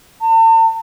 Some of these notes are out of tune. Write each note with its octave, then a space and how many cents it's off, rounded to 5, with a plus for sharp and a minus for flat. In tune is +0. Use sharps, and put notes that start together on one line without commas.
A5 +40